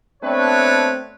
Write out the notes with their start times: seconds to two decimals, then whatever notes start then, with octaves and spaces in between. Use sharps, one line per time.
0.23 A3 B3 C4 D4 B4 C#5